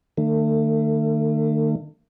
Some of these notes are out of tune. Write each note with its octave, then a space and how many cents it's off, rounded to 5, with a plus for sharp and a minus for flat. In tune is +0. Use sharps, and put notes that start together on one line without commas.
D#3 -45 A3 +35